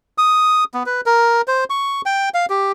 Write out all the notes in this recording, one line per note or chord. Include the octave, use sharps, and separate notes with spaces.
D#6
B3
B4
A#4
C5
C#6
G5
F5
G4